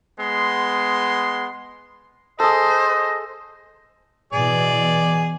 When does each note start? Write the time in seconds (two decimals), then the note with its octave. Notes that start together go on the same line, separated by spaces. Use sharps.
0.18 G#3 B3 C6
2.40 G#4 A4 C5 D#5
4.33 B2 E3 G#4 D5